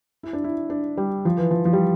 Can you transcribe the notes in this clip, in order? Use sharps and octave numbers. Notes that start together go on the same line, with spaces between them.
E4
D4
E4
D4
G3
F3
E3
F3
F3
G3